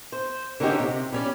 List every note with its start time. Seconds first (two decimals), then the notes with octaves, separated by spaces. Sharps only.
0.12 C5
0.60 D3 A#3 C4 C#4 D#4 G4
0.80 C3
1.12 G3 C#4 D5